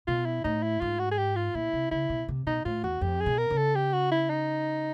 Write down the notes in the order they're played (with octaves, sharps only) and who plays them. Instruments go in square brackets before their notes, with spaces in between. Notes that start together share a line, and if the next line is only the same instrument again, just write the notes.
[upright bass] B2 [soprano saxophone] F4
[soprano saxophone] E4
[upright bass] A2 [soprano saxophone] D#4
[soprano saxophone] E4
[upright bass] G#2 [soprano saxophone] F4
[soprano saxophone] F#4
G#4
G4
F4
[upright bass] A#2 [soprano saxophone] E4
[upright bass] C3
[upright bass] C#3 [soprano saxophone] E4
[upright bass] B2
C3
[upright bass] B2 [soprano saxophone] D#4
[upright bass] A2 [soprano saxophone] F4
[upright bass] E2 [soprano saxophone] F#4
[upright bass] F2 [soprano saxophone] G4
[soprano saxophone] G#4
[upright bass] B2
[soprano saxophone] A#4
[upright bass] C#3
[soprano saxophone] A4
G4
F#4
E4
D#4